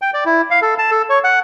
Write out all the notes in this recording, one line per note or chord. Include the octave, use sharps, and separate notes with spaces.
G5
D5
E4
F5
A4
A5
A4
C#5
F#5